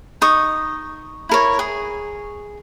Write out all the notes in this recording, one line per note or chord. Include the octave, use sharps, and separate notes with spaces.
D#4 C#6 D#6
E4 A#4 C#5
G#4